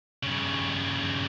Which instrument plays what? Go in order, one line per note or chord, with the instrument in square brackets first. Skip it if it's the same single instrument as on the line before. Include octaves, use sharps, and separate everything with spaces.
[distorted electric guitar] G2 C#3